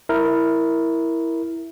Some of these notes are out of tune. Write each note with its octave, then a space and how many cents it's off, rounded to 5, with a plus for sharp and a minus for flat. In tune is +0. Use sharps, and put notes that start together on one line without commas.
E4 +0 A#4 +0